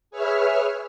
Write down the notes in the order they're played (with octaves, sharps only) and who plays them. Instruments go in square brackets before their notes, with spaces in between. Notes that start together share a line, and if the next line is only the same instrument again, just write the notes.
[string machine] G#4 B4 C#5 E5 F6